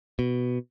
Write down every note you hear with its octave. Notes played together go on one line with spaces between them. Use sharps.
B2